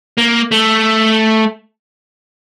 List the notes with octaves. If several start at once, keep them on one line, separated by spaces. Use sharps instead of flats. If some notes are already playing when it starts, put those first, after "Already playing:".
A#3
A3